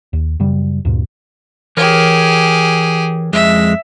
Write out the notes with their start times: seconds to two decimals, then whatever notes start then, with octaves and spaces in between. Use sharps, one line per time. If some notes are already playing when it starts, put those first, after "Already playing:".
0.13 D#2
0.40 F#2 C#3 G3
0.85 D2 G2 A#2
1.77 E3 G4 G#4 A#4 C#5
3.33 F2 G#3 E5